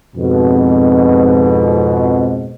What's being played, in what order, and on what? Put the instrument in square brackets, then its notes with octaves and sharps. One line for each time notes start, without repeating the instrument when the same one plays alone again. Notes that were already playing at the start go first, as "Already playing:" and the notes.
[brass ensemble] F2 G#2 B2